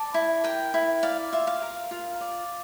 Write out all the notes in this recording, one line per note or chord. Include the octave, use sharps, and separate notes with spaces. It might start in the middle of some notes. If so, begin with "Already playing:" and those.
Already playing: D5 A5
E4
A#4 G5
E4
D5 F5
F4 E5
F5
A#4
F4
D5